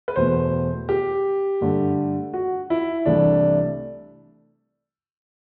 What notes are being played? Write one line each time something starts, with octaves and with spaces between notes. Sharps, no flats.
B4
E2 B2 A3 C5
G4
G2 D3 A3
F#4
E4
C2 C3 E3 A3 D4